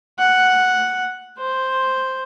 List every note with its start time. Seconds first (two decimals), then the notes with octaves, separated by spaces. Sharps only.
0.19 F#5
1.38 C5